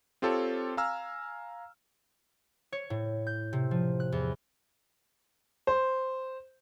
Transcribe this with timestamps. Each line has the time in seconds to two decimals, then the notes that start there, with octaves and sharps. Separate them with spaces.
0.22 C4 F4 G4 A4 C#5 A5
0.77 F5 G#5 A#5 E6 F6
2.72 C#5
2.90 A2
3.27 G6
3.53 C3
3.71 F3
4.00 F#6
4.12 E2
5.67 C5